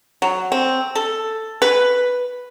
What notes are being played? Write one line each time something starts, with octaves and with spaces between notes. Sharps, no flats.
F#3
C4
A4
B4